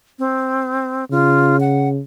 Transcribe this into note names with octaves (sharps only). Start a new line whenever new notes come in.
C4
C#3 F4
F#5